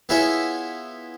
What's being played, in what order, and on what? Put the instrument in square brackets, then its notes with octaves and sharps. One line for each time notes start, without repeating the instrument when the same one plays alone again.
[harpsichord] B3 E4 F4 G#4 C#5 E5